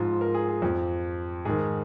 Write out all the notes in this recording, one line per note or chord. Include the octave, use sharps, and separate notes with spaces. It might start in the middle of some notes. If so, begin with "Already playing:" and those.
Already playing: G#2 F3 F4
A#4
G#4
G#4
F2 F3
G#2 D#3 G#4